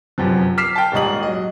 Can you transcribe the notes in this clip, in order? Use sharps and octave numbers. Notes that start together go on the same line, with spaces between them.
G1 F#2 C3 F3
D6 F6 B6 C7 E7
G5 A5
D#1 G#2 G3 D#5 D#6 F#7
F#3 D#5